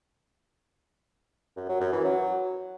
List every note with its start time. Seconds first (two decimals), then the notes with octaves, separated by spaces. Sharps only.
1.57 F#2
1.69 F#3
1.81 F#2
1.92 E3
2.04 F#3